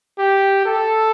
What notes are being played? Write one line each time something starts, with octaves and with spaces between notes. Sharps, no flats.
G4
A4